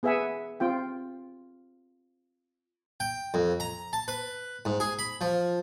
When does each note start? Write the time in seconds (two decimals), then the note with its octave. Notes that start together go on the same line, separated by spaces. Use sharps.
0.03 B3 G#4 B4 E5 F#5 G#5
0.60 C4 F4 G5
3.00 G5
3.34 F2
3.60 A#5
3.93 A5
4.08 B4
4.65 G#2
4.80 G#4
4.99 B5
5.21 F3